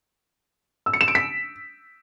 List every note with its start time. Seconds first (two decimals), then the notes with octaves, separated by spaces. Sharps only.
0.86 E6
0.93 C#7
1.01 E7
1.08 D7
1.15 B6